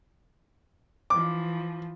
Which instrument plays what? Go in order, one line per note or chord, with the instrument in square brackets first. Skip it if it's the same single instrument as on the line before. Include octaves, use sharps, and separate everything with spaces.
[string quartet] E3 F3 [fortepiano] D6